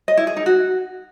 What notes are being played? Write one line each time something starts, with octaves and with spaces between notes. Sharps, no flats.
D#5
E4
G#4
D#4
F#4